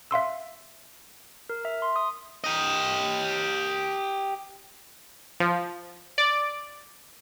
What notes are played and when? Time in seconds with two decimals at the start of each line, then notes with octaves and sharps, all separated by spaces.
0.11 E5 F5 C6 E6
1.50 A#4
1.65 E5
1.82 C6
1.96 D#6
2.44 G4 D#5
5.40 F3
6.18 D5